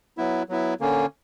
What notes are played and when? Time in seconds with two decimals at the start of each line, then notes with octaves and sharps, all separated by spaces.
0.17 F#3 B3 E4
0.49 F#3 B3 E4
0.80 D3 A#3 C#4